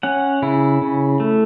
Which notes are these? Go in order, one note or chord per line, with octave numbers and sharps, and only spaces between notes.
C#4 F#5
C#3 E4
C#3
A3